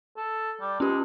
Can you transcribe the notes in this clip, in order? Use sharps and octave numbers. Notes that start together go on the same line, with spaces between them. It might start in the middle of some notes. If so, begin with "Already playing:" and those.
A4
G3
G#3 C#4 G4